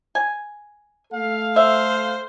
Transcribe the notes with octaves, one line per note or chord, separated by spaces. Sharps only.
G#5
A3 A4 F5
C5 E5